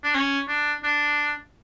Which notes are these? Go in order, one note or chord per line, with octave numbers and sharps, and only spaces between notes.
D4
C#4
D4
D4